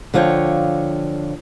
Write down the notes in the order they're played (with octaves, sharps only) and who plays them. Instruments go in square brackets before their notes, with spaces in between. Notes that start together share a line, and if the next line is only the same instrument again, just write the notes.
[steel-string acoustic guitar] D3 F3 F4 C#5 F#5 G5